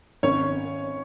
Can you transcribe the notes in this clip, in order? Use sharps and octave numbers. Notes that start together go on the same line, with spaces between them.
G#1 C#4 C#5